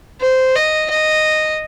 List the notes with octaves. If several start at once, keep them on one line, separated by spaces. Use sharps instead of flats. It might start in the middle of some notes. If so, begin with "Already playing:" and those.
C5
D#5
D#5